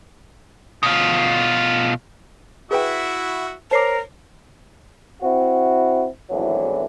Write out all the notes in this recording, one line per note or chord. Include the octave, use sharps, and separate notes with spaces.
B2 F4
E4 F#4 G#4 B4 E5 G5
A#4 C5 C#5 A5 D6 C7
C4 E4 F#4
G#1 E2 A2 D3 E3 F#3